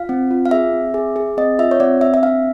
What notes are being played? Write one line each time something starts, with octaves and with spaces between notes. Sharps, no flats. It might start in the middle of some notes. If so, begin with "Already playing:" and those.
Already playing: F4 F5
C4
F4
F5
G#4 E5
C4
G#4
G#4
C4 D#5
F4 E5
C#5
C4 D5
C4 E5
E5
D4 F5